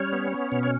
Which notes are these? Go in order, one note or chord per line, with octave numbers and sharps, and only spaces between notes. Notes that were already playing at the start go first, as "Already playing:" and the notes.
Already playing: G3 C#4 C#5
B3
B3
B2
C#5